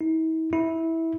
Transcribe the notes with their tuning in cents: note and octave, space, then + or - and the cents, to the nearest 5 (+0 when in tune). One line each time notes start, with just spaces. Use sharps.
E4 -45
E4 -15